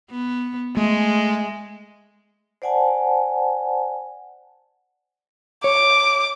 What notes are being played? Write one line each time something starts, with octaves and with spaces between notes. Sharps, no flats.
B3
G#3 A3
C5 D5 F#5 G#5 A5
C#5 D6